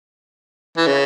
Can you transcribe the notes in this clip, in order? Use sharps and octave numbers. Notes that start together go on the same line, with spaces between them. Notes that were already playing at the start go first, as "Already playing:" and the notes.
E3
C#3